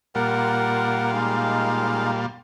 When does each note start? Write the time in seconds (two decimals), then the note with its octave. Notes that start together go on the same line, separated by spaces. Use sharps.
0.15 A#2 G3 F4 A#4 F#5
1.13 G#3 D#4 F5